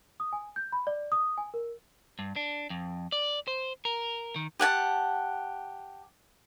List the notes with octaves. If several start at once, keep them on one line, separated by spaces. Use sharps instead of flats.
D#6
G#5
G6
B5
D5
D#6
G#5
A#4
G2
D4
F2
D5
C5
A#4
D#3
G4 F#5 G#5 A5